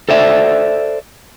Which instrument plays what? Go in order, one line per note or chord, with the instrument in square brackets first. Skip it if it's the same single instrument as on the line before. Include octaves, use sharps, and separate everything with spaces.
[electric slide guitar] A4 C5 D5 E5